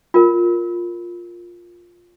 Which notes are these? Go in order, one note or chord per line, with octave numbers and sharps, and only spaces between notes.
F4 A#4